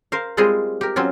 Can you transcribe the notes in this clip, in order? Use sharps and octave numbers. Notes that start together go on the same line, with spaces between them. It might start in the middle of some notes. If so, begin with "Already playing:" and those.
A#4 C5 F5
G3 G#3 C4 F4 G#4 D#5
G4 A#4
F#3 C4 C#4 F4